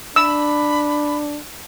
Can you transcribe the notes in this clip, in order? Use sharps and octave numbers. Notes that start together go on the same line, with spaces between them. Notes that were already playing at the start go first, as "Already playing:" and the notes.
D4 B5 E6